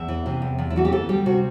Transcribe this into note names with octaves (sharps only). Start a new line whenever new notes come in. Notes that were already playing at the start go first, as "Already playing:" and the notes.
Already playing: E2 E5
E3
C3
E2
E2
E4
E3 F#4
G4
D2 A4
G3 G4
C3 F#4